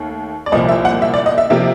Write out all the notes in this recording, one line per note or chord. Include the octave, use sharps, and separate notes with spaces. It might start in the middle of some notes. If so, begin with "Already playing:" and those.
Already playing: D#2 D#3 A3
D5
C2 A#2 F3 D#5
E5
F#5
E5
D5
D#5
E5
C3 F3 A#3 E5